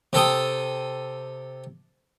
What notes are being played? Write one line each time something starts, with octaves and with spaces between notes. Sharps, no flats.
C3 A4 G5 D#6